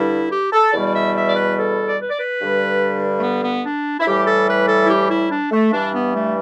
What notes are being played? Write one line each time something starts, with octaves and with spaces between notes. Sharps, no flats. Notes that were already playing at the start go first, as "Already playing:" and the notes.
Already playing: G2 D3 G3 E4
G4
A4
E2 B2 G3 D5
D5
E5
E5
D5
B4
A4
D5
B4
D5
B4
G2 D3 G3
A3
B3
B3
D4
E4
A2 E3 G3 G4
A4
B4
A4
E4
G4
E4
D4
A3
G2 E3 G3 D4
B3
A3